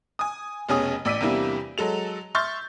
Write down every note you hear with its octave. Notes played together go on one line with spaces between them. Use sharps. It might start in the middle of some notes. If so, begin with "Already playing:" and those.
G#5 D#6
F1 B2 C#4 G#4 G#5 D#6
A1 D5 E6 B6 D7 D#7
E2 C3 G3 A#3 D4 E4
F#3 G#3 A4 F7
E5 C6 C#6 F6 G6 A6